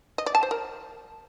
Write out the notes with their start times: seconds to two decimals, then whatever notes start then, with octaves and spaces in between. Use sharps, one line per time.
0.18 D#5
0.26 D5
0.35 A5
0.43 C5
0.51 A#4